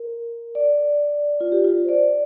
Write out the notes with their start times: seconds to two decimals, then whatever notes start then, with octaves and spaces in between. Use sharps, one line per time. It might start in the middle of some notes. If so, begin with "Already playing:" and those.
Already playing: A#4
0.55 D5
1.41 F4
1.52 G4
1.64 F4
1.84 C5
1.89 D5